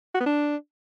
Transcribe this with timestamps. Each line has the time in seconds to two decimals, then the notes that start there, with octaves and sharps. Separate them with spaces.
0.15 F#4
0.20 B3
0.26 D4